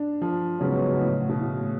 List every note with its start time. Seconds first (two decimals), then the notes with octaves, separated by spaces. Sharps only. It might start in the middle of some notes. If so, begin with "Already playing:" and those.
Already playing: D4
0.21 F3
0.60 G#2 C#3 F#3 B3
1.00 A2
1.29 B2
1.40 A2